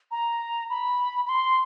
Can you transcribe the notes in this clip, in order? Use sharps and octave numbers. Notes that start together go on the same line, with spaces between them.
A#5
B5
B5
C6